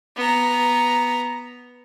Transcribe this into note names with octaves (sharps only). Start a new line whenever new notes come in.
B3 A#5